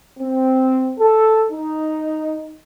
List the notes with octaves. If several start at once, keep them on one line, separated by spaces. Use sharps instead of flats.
C4
A4
D#4